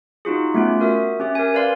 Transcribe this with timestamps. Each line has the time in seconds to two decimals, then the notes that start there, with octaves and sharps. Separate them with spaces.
0.25 D#4 F4 F#4 G#4
0.54 A3 B3 C#4 F4 G4
0.80 F#4 A#4 E5 D#6
1.20 C#4 G4 E5
1.35 A#4 G#5
1.54 B4 D5 F5 C6